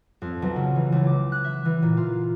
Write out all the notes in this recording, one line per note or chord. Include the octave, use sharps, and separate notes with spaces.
F2
B1
C#3
E3
C#2
D6
F#6
E5
E3
A#2
F4